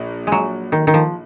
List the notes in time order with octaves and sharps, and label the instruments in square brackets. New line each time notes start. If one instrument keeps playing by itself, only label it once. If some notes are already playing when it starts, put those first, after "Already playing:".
Already playing: [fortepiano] A#1 A#2
[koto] F#3 G#3
D#3
D#3
F3